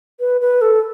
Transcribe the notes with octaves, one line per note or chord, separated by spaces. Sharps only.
B4
B4
A4